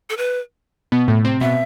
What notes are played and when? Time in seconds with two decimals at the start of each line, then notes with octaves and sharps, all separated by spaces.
0.10 A4
0.17 B4
0.92 B2 B3
1.08 A2 A3
1.25 C3 C4
1.41 B2 B3 E5